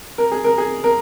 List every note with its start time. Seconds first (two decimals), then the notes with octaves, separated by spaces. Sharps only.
0.18 A#4
0.32 G#4
0.44 A#4
0.58 G#4
0.84 A#4